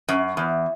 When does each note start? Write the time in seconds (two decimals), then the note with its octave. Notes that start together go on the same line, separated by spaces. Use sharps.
0.08 F#2
0.37 E2